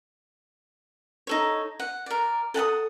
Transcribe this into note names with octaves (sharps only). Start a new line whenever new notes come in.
D#4 A4 C#5
F#5
A#4 D5
A4 F#5 A5 D#6